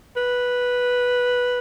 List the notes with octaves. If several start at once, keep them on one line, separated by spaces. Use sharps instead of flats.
B4